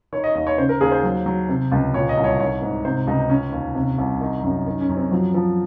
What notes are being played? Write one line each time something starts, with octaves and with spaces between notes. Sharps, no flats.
D#3 C#5
D#5
D#2 D#5
C#5
C#3 C5
A#4
D#2 G#4
C5
F#3
F#3
C3
C#2
A#2 C#5
D#5
C2
C#5
D#3 C#5
G#2
C3 C5
C#2 D#4
C#3 C#4
D#2
C3
C2
D#3 D#4
F#2
D#3
C#4
F#2
C4
F3 F#3
F3